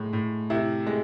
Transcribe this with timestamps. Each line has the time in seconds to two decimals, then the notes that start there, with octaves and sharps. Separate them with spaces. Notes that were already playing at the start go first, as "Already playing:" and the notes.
Already playing: A2 G#3
0.13 A2
0.50 C3 E4
0.87 G#3